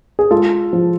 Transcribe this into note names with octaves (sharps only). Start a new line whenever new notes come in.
G#4
G#3 F4 A4
F3